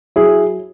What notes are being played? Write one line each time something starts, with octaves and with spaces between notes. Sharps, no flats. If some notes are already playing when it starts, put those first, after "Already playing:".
F#3 E4 G#4